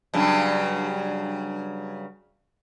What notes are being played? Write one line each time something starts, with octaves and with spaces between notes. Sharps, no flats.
G2 C#3 F#3